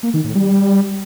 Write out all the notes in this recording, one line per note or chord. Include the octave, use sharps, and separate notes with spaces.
A#3
D#3
A2
G3